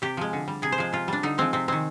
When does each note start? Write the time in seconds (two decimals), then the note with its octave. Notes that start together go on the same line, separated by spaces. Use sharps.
0.02 C3 G4
0.17 F3 G#3
0.33 D3
0.48 G3
0.62 C3 G#4
0.72 C5
0.78 F3 G#3
0.93 C3 F4
1.08 G3 D4
1.23 D3 D#4
1.38 F3 G#3 C4
1.53 C3 C4
1.68 D#3 G#3 C4